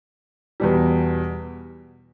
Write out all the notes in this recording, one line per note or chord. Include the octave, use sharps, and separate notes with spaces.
E2 B2 G3